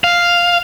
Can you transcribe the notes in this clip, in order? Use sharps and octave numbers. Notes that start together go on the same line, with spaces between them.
F5